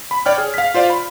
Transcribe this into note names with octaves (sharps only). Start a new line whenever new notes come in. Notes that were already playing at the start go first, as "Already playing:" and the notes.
B5
C#5 D5 G5 F6
G#4
F5 B6
F4 C5 D5 F5
B5